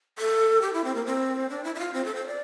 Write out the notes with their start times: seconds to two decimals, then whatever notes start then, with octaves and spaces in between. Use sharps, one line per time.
0.19 A4
0.62 G4
0.73 E4
0.84 C4
0.95 A#3
1.06 C4
1.50 D4
1.64 E4
1.75 E4
1.79 F4
1.94 C4
2.05 A4
2.15 C5
2.27 D5